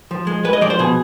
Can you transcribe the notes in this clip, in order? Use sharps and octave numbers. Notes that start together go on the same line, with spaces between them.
F3
G#3
G#3 B4
D#5
F3 D5
C5
B2 G#4